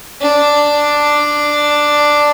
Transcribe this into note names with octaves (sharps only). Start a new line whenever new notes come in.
D4